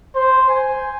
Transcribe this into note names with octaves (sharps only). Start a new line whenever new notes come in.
C5
G#5